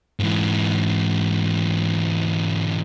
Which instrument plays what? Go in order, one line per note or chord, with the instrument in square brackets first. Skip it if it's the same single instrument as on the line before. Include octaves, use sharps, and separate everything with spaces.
[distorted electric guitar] G#2 E3